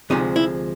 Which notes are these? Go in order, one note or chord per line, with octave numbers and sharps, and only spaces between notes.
D2 C3 F3 G#3 D#4
E4